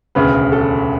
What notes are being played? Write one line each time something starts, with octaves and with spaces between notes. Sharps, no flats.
E1 D2 C#3 B4
A4